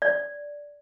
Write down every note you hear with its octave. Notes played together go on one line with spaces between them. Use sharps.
D5